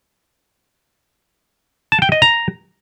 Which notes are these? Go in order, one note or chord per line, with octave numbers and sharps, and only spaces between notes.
A5
G5
D#5
A#5